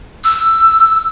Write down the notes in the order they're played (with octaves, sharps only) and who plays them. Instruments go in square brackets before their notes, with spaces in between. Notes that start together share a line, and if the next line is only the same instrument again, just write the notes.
[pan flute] E6